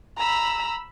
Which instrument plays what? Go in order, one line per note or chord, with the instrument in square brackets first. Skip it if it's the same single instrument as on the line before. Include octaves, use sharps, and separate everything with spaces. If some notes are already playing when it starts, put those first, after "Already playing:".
[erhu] A#5 [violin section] B5 E6